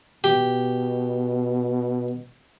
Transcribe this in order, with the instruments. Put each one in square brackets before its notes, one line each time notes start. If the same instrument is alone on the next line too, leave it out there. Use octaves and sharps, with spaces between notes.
[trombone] B2 [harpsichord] G4